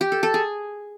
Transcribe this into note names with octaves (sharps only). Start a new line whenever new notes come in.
G4
A4
A4
G#4